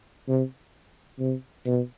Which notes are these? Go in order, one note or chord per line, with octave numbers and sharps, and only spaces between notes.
C3
C3
B2